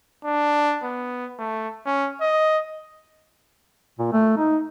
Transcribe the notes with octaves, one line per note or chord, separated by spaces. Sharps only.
D4
B3
A3
C#4
D#5
A#2
A3
D#4